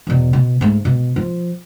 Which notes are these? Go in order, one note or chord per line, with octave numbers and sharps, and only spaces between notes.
E2 B2
B2
G#2 A3
B2
F3